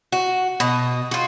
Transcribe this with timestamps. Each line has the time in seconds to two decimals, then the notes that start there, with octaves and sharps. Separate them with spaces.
0.12 F#4
0.60 B2 D#5
1.11 F4 F#4